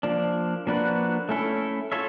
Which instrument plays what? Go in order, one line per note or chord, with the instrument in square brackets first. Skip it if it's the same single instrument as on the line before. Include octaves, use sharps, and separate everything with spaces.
[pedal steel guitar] F3 A#3 D4
F3 A#3 D4 F#4 B4
A3 C#4 E4 A4
F4 A4 C#5 E5